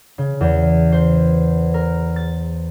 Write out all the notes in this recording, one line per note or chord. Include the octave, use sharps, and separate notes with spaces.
C#3
E2
C5
A#4
A6